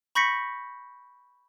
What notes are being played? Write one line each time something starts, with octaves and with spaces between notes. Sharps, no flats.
B5 C#6 G6 A#6 B6 C#7